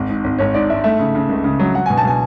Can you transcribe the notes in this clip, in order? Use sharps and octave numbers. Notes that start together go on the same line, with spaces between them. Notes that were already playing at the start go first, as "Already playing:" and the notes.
Already playing: G#1
G#2
G#1
G#1 C#5
G#2 D5
G#2 E5
A3 E5
C#3
C#3
C#2
C#3
F#3
F#3 F#5
G#5
B2
A5
B2 G#5